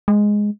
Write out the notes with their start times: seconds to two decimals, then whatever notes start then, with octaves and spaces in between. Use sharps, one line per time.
0.08 G#3